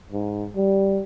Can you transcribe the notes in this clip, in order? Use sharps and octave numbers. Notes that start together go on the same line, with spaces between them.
G#2
G3